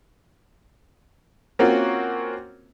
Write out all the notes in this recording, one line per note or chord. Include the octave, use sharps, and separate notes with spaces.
A#3 C4 C#4 F4 F#4 A#4